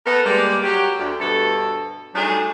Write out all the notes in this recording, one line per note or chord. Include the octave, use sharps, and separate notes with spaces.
B3 A4 A#4
G3 G#3 A#3
F#3 G4
D2
D2 G2 B2 A4
F#3 G3 A3 D4 D#4 G#4